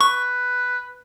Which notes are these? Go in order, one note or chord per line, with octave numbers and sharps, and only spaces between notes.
B4 C#6